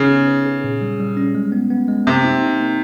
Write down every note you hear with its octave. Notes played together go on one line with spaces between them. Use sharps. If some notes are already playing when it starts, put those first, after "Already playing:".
Already playing: C#3 C#4 D#4
B3
B4
G#4
A#2
G3
G3
C#4
G#3
B3
B3
G#3
C3 A#3
D#4
D#4
A#3